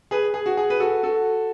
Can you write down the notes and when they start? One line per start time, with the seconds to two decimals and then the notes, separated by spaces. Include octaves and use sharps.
0.11 G#4 B4
0.34 G#4
0.46 F#4
0.57 G#4
0.70 B4
0.80 F#4 A4
1.03 F#4 A4